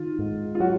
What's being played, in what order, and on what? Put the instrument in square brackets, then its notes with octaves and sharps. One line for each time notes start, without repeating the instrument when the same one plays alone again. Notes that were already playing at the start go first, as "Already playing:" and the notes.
Already playing: [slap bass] D#3 [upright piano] F4
[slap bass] G#2
[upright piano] F4
[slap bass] F#3 [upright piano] F#4